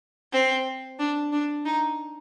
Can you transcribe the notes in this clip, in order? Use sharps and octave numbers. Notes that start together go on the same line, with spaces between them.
C4
D4
D4
D#4